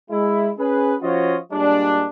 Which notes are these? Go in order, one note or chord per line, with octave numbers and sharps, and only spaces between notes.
G#3 E4
C#4 G#4 B4
F3 C#4 F4 F#4 C#5 D#5
A#2 G3 G#3 D4